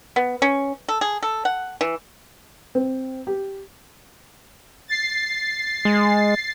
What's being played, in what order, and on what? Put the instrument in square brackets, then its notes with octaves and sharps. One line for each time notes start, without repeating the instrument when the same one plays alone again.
[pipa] B3
C#4
A4
G#4
A4
F#5
E3
[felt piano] C4
G4
[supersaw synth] A6 C7
[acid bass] G#3